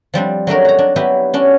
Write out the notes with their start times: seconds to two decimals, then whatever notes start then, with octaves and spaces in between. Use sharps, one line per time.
0.14 F3 G3 C4 D4
0.47 F#3 A3 D4 A#4
0.65 F#4 A#5
0.79 D4
0.96 F#3 B3 E4 G4 B4
1.34 C#4 D4 F#4